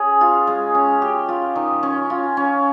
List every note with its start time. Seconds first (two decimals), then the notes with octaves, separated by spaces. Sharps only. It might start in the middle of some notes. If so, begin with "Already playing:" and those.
Already playing: C#4 G#4
0.21 F4
0.47 G#3
0.75 C#4
1.02 G4
1.29 F4
1.55 D#3
1.83 C#4
2.10 F4
2.37 C#4